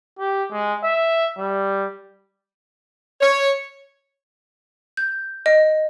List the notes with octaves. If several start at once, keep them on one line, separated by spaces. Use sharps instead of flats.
G4
G#3
E5
G3
C#5
G6
D#5